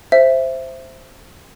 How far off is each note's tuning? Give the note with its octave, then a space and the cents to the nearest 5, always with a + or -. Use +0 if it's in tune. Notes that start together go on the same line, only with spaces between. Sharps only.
C5 +0 E5 +10